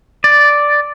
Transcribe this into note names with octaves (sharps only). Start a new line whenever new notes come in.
D5